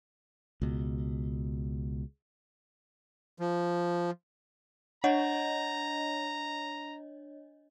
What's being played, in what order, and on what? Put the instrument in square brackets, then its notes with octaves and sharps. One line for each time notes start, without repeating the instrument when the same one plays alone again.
[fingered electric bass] C#2 B2
[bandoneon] F3
[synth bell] D4 C#5 D#5 [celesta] F#5 [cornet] A#5